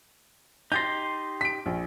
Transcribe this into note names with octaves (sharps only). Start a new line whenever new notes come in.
D#4 G4 C6 G6 A6 A#6
B6 D7
A#1